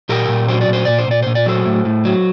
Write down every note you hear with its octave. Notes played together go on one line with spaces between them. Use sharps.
A#2 G4 A#4
A#2
F#3 C5
D5
A#2
C5
A#2 D5
C5
A#2 D5
A#2 C5
D5
F#3 A4 C5
A2
A2
F#3